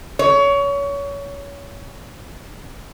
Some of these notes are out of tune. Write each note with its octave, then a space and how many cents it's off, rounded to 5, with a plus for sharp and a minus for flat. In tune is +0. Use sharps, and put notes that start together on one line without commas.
C#5 +25